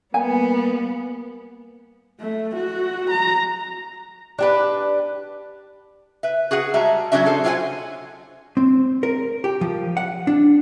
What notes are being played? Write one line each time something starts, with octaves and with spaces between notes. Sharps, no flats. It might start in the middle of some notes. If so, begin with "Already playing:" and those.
G3 A#3 B3 G#5
A3
F#4
A#5
D4 G4 B4
B4 E5
F#4 G#4 B4 F#5
G3 G#3 E5 A5 A#5
F#3 B3 C#4 D4 F#4 E5
G#4 A4 C5
D4 F4 C#5 E5 F#5 G#5
C4
A#4
G4
F3
F#5
D4